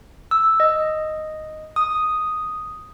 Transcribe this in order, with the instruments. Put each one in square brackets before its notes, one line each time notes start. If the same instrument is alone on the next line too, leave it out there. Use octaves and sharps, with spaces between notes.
[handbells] E6
D#5
D#6